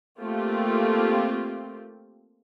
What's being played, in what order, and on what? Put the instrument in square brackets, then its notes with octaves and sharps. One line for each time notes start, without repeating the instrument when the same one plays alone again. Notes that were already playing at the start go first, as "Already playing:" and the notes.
[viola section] A3 A#3 C4 F4 G4